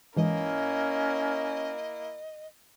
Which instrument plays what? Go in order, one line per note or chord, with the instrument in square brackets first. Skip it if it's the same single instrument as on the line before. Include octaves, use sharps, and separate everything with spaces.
[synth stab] G#2 E3 [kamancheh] A#3 E4 [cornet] C#4 [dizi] D#5